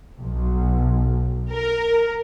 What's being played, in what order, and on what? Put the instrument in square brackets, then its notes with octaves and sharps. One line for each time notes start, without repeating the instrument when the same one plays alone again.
[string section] B1
A#4